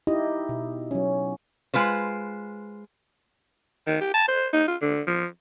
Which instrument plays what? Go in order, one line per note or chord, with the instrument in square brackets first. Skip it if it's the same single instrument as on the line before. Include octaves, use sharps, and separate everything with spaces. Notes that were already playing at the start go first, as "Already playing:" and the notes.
[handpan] D#4 E4 G4 D#5
B2
F#3 C#4
[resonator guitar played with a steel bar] G#3 F4 B4 C5
[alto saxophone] D#3
G4
A5
C5
D#4
F4
D3
F3